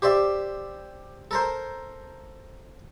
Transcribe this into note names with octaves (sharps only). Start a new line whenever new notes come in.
G4 C5 D5 E5
A4 A#4 C5